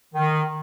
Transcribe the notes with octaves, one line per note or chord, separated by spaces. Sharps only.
D#3